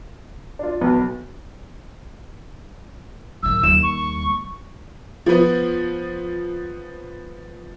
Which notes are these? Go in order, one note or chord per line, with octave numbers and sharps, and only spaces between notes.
D4 F4
B1 B2 B3
A1 D#3 E6
D#2 G3 E7
C#6
F3 B3